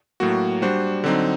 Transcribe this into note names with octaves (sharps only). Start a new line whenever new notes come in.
A2 F#3 A#3 F#4
G3 D4 F#4 C5
D3 F#3 C4 D#4